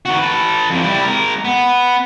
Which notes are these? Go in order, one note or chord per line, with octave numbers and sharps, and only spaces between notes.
D#3 F#4
A4 B4
F2 E3
G3 E4
G#3 A#4
B3